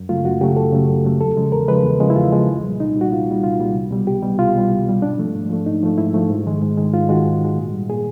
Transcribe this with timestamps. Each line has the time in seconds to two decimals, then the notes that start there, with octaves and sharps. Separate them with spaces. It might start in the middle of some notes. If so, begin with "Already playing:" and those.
Already playing: F#2
0.09 C#3 F#3 A3 F4
0.25 F#2 F#4
0.41 C#3 F#3 A3 G4
0.57 F#2 A4
0.73 C#3 F#3 A3
0.89 F#2
1.05 C#3 F#3 A3
1.21 E2 A4
1.37 C#3 F3 G#3
1.52 E2 A#4
1.68 C#3 F3 G#3 B4
1.84 E2
2.00 C#3 F3 G#3
2.10 E4
2.16 E2 F4
2.31 C#3 F3 G#3
2.48 C2
2.63 A#2 G3
2.79 C2 D#4
2.96 A#2 G3
3.01 F#4
3.11 C2 F4
3.28 A#2 G3
3.43 C2 F4
3.59 A#2 G3
3.75 C2
3.91 B2 G3
4.07 C2 G4
4.23 B2 G3
4.39 C2 F4
4.55 B2 G3
4.70 C2
4.86 B2 G3
5.02 G#2 D4
5.18 F3 A3
5.35 G#2
5.50 F3 A3
5.66 G#2 D#4
5.82 F3 A3
5.98 G#2 E4
6.14 F3 A3
6.29 G#2
6.46 D#3 G#3
6.62 G#2
6.77 D#3 G#3
6.93 G#2 F4
7.09 D#3 G#3 F#4
7.25 G#2
7.41 D#3 G#3
7.58 A#2
7.73 G3
7.89 A#2 G#4